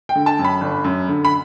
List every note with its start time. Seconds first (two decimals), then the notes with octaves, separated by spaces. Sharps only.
0.09 G5
0.15 D3
0.26 A5
0.39 F#2
0.45 B5
0.61 G1
0.84 F#2
1.09 D3
1.25 B5